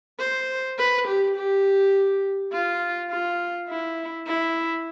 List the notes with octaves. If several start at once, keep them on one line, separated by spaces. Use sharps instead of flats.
C5
B4
G4
G4
F4
F4
E4
E4